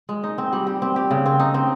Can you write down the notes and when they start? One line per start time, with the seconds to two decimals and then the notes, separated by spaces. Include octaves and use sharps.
0.09 G#3
0.23 D#4
0.38 C4
0.53 G3
0.67 G4
0.82 C4
0.96 G4
1.11 C#3
1.26 C4
1.40 D#4
1.54 C4